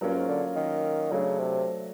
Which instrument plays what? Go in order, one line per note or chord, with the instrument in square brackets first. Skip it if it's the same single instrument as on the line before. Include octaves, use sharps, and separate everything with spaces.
[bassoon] G2 [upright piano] F#3 A#3 C#4 F4
[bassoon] G#2
D3
D#3
[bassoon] C#3 [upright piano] F#3 A3 D4
[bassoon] C3